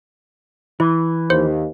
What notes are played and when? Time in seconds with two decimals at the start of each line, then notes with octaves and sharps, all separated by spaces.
0.80 E3 E4
1.30 D#2 C5